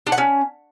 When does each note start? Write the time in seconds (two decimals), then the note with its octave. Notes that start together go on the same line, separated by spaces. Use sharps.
0.07 D4
0.12 F#5
0.18 C#4